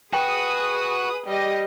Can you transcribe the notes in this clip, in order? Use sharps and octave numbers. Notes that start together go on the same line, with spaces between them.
F#4 G#4 B4 G5 D#6
G3 G4 D#5